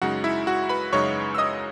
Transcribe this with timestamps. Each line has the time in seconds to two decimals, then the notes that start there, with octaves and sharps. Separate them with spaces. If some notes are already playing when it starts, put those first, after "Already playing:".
0.02 F#2 C#3 G#3 D#4 F#4 F#5
0.24 E4 E5
0.47 F#4 F#5
0.69 B4 B5
0.93 F#2 C#3 G#3 D#4 C#5 C#6
1.35 E6
1.38 D#5 D#6